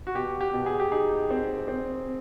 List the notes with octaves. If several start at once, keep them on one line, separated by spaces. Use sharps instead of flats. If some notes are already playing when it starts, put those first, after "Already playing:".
F#4
B2 G4
G4
B2
G#4
G4
D#4 G#4
C4
C4